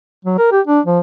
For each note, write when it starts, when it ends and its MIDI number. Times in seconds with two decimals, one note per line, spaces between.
0.25 0.37 54
0.38 0.48 70
0.51 0.61 67
0.67 0.80 62
0.85 1.00 53